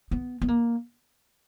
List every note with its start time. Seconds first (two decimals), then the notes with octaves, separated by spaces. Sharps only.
0.11 B3
0.42 B3
0.48 A#3